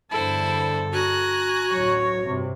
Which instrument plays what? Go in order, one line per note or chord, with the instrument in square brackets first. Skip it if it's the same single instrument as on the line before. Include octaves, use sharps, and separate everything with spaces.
[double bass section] E2 G2 D3 [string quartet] E4 C5 [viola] A4
[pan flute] F#4 [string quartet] G#5 A#5 F#6
[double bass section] A1 D2 F#3 [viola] C#5
[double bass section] G2 C3